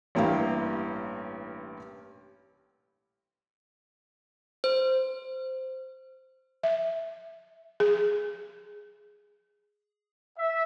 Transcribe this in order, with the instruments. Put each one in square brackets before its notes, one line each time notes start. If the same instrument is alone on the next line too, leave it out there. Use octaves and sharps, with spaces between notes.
[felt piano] A1 G2 A#3 E4 G4 F5
[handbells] C5
[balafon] E5
G#4
[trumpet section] E5